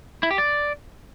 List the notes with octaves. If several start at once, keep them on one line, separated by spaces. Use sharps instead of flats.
E4
G4
D5